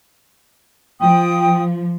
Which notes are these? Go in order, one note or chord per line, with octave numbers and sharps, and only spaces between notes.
F3 G5 D#6